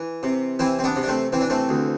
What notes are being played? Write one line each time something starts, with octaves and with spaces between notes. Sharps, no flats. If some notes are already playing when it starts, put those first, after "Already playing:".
Already playing: E3
C3
E3 C4 E4
C4
B3 D4
C3
D4
A3 C4
E3 C4
D4
A3 C4
D2